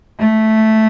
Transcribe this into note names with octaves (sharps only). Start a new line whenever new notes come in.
A3